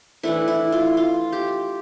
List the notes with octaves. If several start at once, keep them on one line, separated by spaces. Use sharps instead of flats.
E3 A3 D4 E4
E4
F4
F4
G4